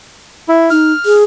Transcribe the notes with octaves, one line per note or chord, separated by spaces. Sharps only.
E4
D#4 F6
G#4